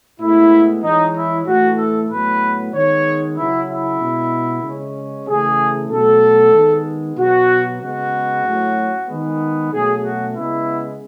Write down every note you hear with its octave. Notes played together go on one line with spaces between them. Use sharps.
A2 G#3 B3 E4
E3 G#3 C#4 D#4
E4
A2 E3 A3 F#4
A4
A2 F#3 B3 B4
D#3 G#3 B3 C#5
C#3 F#3 C#4 E4
E4
B2 G#3 B3
C#3 G#3 C#4
C#3 E3 A3 G#4
B2 F#3 A3 A4
D#3 G#3 B3
B2 F#3 B3 F#4
C#3 G#3 B3 F#4
A2 F#3 C#4
D#3 G#3 B3
B2 F#3 A3 C#4 G#4
F#4
C#3 G#3 B3 E4